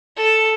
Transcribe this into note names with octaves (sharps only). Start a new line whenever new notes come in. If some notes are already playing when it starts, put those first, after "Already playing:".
A4